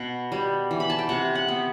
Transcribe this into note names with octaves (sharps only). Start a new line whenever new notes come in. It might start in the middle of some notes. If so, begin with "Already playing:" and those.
Already playing: B2 F#5
G3
E3
B5
A5
G5
C3 F#5
F#5
B3